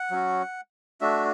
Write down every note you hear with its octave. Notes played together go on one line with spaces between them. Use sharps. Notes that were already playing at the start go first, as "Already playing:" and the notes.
Already playing: F#5
F#3 C#4 F#4
A3 D4 F#4 E5